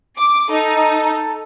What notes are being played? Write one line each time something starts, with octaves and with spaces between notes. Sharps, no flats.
D6
D#4 A4